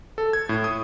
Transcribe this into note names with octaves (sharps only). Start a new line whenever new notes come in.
A4
G#6
A2
D#6